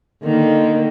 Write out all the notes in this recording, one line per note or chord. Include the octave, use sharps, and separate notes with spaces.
D3 D#3 A#3